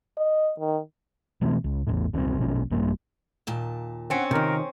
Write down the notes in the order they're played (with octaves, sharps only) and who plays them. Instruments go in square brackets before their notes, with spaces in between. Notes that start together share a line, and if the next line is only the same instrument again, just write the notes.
[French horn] D#5
D#3
[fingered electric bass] B2 E3 A3 C4
C#2
A1 E2 A2
D#1 C2 C#3 C4
A#1 B2 C#4
A#1 G2 G3 A#3
[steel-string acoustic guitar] D#2 A#2 A5
[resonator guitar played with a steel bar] C4 C#4 [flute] F#5
[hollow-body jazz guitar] C3 D#3 [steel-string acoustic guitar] F3 [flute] A#4